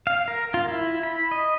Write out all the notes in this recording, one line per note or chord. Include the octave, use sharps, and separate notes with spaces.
F5
A#4
F4
E4
B5
D#5